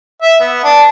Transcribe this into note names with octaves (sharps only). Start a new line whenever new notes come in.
E5
B3
D4